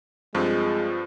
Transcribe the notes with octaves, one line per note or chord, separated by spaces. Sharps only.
G2 F3 G#3 C4 F4 A4